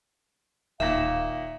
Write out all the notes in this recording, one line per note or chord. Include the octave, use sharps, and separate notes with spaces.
D1 A#2 D#3 E5 F5